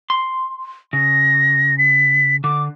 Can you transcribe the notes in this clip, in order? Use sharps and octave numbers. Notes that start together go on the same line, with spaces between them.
C6
C#3 A#6
B6
D3 D6